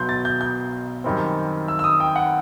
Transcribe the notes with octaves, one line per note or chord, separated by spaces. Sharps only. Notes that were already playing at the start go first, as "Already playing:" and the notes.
Already playing: B1 B2 F#3 C6 G6
A6
G6
G6
F#2 D#3 G3 C4
E6
E6
D#6
G5
F#5